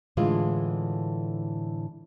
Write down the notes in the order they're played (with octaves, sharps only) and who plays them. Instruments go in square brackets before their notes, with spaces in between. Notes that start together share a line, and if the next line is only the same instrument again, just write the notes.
[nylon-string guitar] A2 D3 E3 G#3 F4